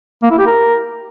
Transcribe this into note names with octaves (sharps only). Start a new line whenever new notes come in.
A#3
E4
G4
A#4